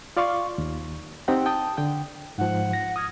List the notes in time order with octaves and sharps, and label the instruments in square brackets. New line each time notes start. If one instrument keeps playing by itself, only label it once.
[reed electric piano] F4 D5 F5 C6 C#6
D#2
C4 D#4 G4 F#5 G5
G5 A5 D#6
D3 G5
[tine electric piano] G#2 F3 [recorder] F#5
[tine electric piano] A#6
D#6 F6 G#6